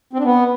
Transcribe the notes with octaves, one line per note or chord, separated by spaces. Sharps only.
C4
D4
B3